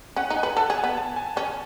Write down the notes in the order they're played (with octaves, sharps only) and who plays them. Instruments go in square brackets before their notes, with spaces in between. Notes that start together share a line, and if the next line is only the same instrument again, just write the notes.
[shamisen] C#4 [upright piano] F#5
[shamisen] D#4
[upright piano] G#5
[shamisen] B4
[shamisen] A4 [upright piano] A5
[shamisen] G#4
[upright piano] G#5
[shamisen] B3
[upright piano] A5
G#5
[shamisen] C#4 [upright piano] G#5